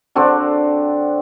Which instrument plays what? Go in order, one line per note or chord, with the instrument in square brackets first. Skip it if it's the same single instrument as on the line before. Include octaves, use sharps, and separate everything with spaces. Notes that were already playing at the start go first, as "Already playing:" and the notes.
[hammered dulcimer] D3 C4 D4 F#4